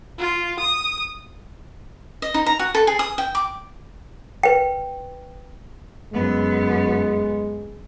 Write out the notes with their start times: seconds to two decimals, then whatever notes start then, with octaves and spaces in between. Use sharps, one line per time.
0.19 F4
0.59 D#6
2.22 D#5
2.34 D#4
2.46 A#5
2.59 F#4
2.75 A4
2.87 G#4
2.99 D#6
3.18 G5
3.35 D6
4.43 B4 G5
6.13 F#2 G#3 B3